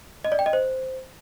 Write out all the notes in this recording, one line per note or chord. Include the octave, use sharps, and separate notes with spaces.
D#5
D5
G5
D#5
C5